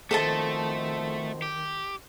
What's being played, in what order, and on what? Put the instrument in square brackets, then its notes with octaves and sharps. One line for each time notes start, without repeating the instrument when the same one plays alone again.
[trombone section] F2 B2 C5 [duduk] D#3 [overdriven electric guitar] A3 [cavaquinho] A4 D#5 A5
[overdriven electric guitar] G4